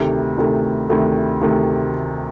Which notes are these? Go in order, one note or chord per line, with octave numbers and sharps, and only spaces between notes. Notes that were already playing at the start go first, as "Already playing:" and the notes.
Already playing: D2 C3 D#3 A3
D2 C3 D#3 A3
D2 C3 D#3 A3
D2 C3 D#3 A3